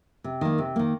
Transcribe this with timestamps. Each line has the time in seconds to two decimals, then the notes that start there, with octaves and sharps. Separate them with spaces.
0.24 C3
0.41 D#3 A#3
0.58 C3
0.76 D#3 A#3